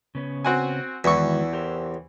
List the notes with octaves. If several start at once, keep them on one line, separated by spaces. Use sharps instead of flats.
C#3 B3 C#4
C4 F#4 G#5
E2 D#3 E3 G#3 F#4 C#6
G4 A#4 C5